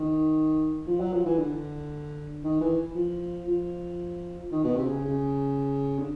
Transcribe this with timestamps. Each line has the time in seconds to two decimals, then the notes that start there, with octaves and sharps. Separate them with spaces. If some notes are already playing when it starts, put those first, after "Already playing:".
Already playing: D#3
0.87 F3
1.00 F#3
1.13 F3
1.25 E3
1.39 D3
2.44 D#3
2.61 E3
2.95 F3
3.47 F3
4.52 D#3
4.64 B2
4.76 C3
4.86 C#3
5.04 C#3
5.99 D3